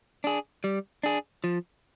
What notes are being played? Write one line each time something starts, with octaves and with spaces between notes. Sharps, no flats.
D4 G#4
G3
D4 G#4
F3